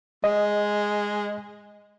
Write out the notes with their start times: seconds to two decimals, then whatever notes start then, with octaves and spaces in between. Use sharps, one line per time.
0.24 G#3 D#5